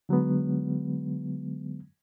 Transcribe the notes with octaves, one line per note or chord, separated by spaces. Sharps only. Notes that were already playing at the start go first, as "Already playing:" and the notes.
D3 F#3 G#3 B3